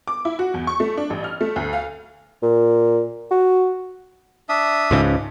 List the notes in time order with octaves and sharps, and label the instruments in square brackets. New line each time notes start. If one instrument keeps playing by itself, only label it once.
[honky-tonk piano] D6
E4
F#4
E2
C#6
A3
D4
A1
F6
A3
D2
F5
[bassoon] A#2
F#4
[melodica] D4 E5 D#6
[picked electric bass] C#2 G#2 C#3